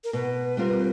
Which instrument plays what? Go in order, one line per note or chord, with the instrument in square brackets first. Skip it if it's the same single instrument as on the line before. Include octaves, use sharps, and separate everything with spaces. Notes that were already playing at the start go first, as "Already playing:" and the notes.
[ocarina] A#4
[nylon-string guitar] B2 [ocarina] B4
[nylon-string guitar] G3 C4 F4 A#4